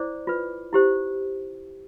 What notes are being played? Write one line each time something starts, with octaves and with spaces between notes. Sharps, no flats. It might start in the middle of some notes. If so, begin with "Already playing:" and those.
Already playing: E4 C5 D5 D6
F4 B4
E4 G4 C5